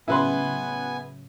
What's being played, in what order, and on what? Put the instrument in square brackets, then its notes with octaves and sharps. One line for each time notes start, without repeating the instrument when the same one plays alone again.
[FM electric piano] A2 C#3 F#3 [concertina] B3 G#5 [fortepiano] E4 B4 C6